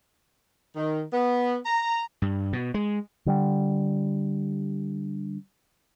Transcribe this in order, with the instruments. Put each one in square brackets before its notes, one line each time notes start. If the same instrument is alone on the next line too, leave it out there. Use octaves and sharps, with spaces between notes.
[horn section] D#3
B3
A#5
[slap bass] G2
B2
G#3
[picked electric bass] D3 G3